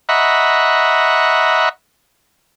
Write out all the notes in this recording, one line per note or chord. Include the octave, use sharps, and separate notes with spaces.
D#5 E5 F#5 A#5 B5 C#6